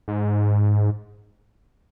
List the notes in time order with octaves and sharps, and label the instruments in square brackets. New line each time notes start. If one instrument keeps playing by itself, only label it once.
[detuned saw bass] G#2